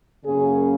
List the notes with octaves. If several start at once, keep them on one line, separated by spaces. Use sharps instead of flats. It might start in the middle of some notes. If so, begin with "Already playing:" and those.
F#2 C#3 A#3 C#4 G#4